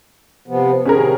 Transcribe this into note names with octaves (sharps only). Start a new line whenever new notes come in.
C3 F3 B3
C3 D#3 F3 C#4 G#4 A#4